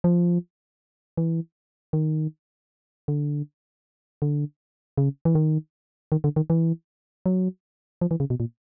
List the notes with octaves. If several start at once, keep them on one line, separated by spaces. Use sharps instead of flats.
F3
E3
D#3
D3
D3
C#3
E3
D#3
D#3
D3
D#3
E3
F#3
F3
E3
C#3
B2
A#2